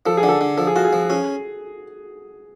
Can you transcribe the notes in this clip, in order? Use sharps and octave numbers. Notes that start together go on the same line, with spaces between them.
F3 A4
G#4
D3
A4
D3
F3 A4
G#4
F4 F#4
G#4
F3
C#4 G#4